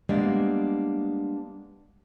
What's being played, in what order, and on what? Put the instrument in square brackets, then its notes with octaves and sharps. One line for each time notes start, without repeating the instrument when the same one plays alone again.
[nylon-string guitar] G3 G#3 A#3 B3 D4